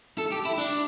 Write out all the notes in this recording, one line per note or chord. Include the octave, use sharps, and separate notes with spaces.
A4
G4
E4
D4